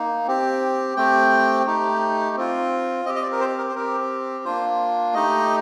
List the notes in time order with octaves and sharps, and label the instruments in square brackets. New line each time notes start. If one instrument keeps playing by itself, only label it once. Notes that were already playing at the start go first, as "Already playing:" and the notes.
Already playing: [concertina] A#3 D#4
C4 G4
A3 C4 G4 G5
A3 D#4 G4
C4 F4
C4 D#5
G4
D#5
D5
A#4
C5
A#4
C5
C4 G4 A#4
A#3 D4 F4 C5
A3 D#4 G4 D#5